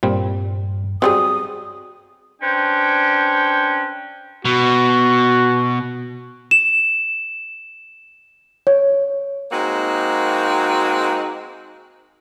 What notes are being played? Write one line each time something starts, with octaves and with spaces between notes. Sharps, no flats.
G2 A#2 G3 C4
F#3 G3 C4 G#4 D#6
C#4 D4 B4 C5 G5
B2 F#4
E7
C#5
G#3 A#3 C4 D#4 F#4